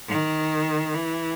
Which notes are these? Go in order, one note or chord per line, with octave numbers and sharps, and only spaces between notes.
D#3
E3